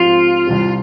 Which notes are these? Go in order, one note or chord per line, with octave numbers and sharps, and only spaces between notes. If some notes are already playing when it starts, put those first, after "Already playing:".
Already playing: G#2 F3 C4 F4 G4
C2 C3 G3 C4